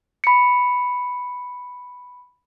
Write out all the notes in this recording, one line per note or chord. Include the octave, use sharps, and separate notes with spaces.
B5 C#7